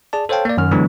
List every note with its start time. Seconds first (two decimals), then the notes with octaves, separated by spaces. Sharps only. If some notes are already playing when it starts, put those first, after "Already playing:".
0.13 G#4 D5 A5
0.29 A4 C5 C#5 F5 G5 A5
0.45 A#3 D5
0.57 F#2 D#3 F6
0.71 D3 E3 F#3 G#3 B3 D4